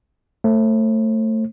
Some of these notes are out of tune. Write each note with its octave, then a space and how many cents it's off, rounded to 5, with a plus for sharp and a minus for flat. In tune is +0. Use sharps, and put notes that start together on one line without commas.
A3 +15 C5 +40